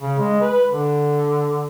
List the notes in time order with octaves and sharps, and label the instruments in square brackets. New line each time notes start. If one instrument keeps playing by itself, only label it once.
[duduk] C#3
G#3
B4
D3